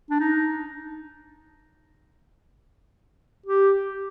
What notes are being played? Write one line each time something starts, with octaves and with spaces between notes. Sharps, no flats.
D4
D#4
G4